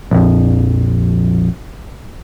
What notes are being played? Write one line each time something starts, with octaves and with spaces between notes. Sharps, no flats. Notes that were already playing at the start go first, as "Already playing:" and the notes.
A#1 F2